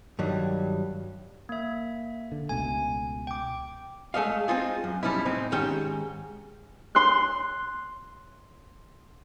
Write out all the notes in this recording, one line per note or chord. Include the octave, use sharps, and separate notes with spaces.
G2 D#3 F#3 G3
A#3 E5
D3
C#2 B2 A3 G#5
G5 D6
G#3 A3 D#5 F5
C4 D#4 F4 G#4
F#2
F3 G3 C#4 D#4 E4
A2 C4 D#4
G#2 D#3 C#4 G4 G5
C6 F#6